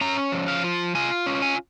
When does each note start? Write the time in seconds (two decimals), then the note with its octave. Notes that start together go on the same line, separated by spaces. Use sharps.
0.01 C#4 A#5
0.32 F3
0.48 F5
0.64 F4
0.95 F4 G#5
1.26 C#4
1.42 G#5